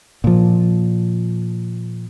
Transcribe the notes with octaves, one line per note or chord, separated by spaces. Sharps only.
A#2 F3